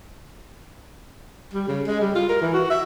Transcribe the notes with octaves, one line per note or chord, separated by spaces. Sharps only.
G3
C#3
G#3
G3
F4
A#4
E3
F#4
E5